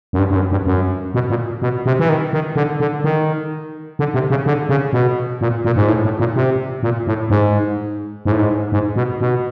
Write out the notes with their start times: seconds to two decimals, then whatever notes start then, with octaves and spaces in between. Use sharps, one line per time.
0.13 F#2
0.19 G2
0.30 G2
0.35 F#2
0.51 G2
0.66 F#2
1.14 B2
1.30 A#2
1.62 B2
1.86 C3
1.99 E3
2.09 D#3
2.33 D#3
2.56 D3
2.80 D3
3.04 D#3
3.99 D3
4.14 C3
4.30 C#3
4.46 D3
4.69 C#3
4.93 B2
5.41 A#2
5.65 A#2
5.76 G#2
5.89 A2
6.05 A2
6.20 A#2
6.36 C3
6.83 A#2
7.07 A2
7.30 G#2
8.25 G#2
8.32 A2
8.39 G#2
8.72 G#2
8.96 B2
9.21 B2